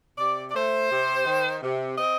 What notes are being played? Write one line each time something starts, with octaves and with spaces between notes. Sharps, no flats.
C3 D5
D5
A3 C5
C3
D#3
C3
C4 D#5